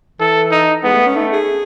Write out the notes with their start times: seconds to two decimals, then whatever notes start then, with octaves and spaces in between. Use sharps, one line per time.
0.20 E3 A4
0.52 D#4
0.84 G#3 B3
0.94 A3
1.06 C#4
1.16 A3 D#4
1.33 G#4